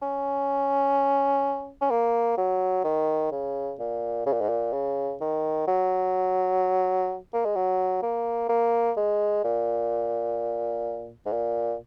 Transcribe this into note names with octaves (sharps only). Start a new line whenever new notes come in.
C#4
C#4
A#3
F#3
D#3
C#3
A#2
C#3
A#2
G#2
A#2
C#3
D#3
F#3
A#3
G#3
F#3
A#3
A#3
G#3
A#2
G#2
A#2